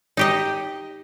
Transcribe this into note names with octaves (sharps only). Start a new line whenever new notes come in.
D#4 G4 D#5